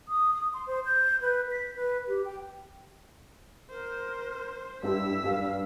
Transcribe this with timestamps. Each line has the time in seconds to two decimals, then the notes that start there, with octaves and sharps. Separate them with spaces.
0.08 D#6
0.33 D#6
0.54 C6
0.67 C5
0.85 G6
1.21 B4
1.52 B6
1.76 B4
2.08 G4
2.25 G5
3.70 A#4 C5
4.83 G2 E4 E6 B6
5.23 G2 F5